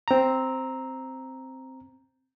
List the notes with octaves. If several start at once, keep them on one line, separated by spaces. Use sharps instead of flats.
C4 A#5